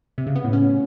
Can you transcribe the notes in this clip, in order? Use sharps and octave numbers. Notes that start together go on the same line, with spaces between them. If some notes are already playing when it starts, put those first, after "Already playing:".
C3
C#3
B3
A2
C#4